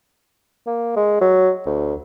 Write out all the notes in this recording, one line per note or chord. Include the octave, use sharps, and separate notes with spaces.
A#3
G#3
F#3
D2